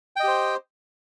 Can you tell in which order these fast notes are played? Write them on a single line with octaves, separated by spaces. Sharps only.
G5 D#5 G4 C5